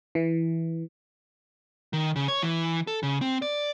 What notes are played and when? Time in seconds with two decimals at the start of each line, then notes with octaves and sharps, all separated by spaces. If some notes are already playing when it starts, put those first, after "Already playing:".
0.15 E3
1.93 D#3
2.16 C#3
2.28 C#5
2.42 E3
2.87 A4
3.03 C#3
3.21 C4
3.42 D5